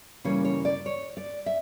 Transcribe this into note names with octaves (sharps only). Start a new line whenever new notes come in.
C#3 E3 G3 A#3 C#5
C#5
D5
C#5
D5
E5